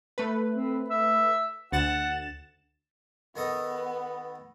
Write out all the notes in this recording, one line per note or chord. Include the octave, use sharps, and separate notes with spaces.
A3 B4
C4
E5
D2 F#5 A6 E7
D#3 B3 A4 D#5